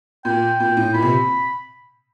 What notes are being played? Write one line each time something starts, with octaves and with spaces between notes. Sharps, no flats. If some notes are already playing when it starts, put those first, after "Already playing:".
A#2 G5
A#2
A2
A#2 B5
C3